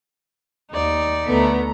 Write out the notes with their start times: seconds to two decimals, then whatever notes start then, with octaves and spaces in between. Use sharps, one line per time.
0.71 D#2 D#4 D5
1.26 D2 A3 B3 A#5